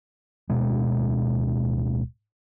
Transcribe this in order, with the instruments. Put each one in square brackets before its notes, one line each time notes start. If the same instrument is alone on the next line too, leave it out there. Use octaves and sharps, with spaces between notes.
[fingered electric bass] D1 B2 G#3